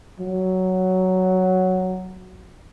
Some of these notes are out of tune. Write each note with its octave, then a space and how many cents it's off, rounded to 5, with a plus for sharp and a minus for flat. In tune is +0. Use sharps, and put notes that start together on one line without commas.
F#3 +5